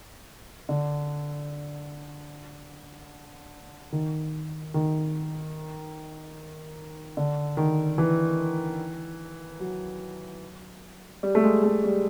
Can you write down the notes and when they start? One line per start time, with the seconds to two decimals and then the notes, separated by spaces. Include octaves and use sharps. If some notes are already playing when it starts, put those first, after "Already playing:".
0.69 D3
3.93 D#3
4.74 D#3
7.17 D3
7.57 D#3
7.98 E3
9.60 F#3
11.23 G3
11.35 A3
11.44 G#3
11.63 A3
11.84 G3